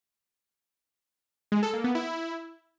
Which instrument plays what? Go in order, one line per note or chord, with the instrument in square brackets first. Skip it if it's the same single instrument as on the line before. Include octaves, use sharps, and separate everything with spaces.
[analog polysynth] G#3
A4
A#3
B3
E4